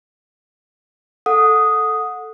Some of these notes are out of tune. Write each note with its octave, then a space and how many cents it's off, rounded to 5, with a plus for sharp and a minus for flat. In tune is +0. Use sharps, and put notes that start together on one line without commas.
A4 +0 F#5 -20 D#6 +0